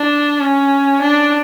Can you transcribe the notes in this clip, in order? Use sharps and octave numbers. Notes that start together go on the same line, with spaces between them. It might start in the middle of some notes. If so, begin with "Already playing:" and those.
Already playing: D4
C#4
D4